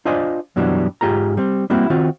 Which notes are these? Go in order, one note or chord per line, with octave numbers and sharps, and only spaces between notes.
D4 F4 C5 D5 D#5 G#5
F#2 B2 E3 F#3 G3 D4
G#2 F4 G4 G#4 A#5
G3 C4
G3 A#3 C4 E4 F#4
D#3 C4 F4 F#4